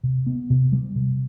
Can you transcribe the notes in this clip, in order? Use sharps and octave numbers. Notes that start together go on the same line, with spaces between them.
C3
B3
C3
G3
C3